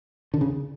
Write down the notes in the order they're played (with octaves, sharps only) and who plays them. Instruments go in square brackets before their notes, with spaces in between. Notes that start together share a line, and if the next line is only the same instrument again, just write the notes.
[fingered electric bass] D3
C#3